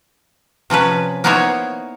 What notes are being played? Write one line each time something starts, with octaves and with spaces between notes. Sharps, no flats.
C3 F3 C#4 B4
A#3 B3 D#4 E4 C5 C#5